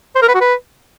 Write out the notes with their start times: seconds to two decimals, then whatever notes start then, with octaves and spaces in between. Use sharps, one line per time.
0.16 C5
0.22 A#4
0.28 B4
0.35 F#4
0.41 B4